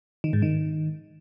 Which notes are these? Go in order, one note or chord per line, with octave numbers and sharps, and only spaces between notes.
D#3
G#2
D#3